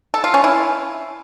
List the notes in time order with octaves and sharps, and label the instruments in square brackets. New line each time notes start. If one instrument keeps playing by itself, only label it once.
[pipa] A4
F4
C#4
E4